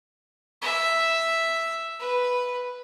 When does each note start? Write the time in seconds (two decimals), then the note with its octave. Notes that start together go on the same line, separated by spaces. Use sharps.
0.62 E5
2.00 B4